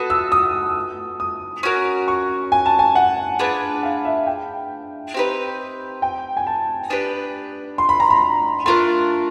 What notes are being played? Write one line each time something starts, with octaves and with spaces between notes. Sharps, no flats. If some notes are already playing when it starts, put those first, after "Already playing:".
Already playing: B3 F#4 A4 D#6
E6
D#6
D#6
C#4 F#4 A#4
C#6
G#5
A5
G#5
F#5
D4 F4 G#4 B4
F5
E5
G5
C4 D#4 G4 B4
G5
G#5
A5
B3 D4 G4 B4
C6
B5
A#5
B5
A3 D4 F4 A#4 C6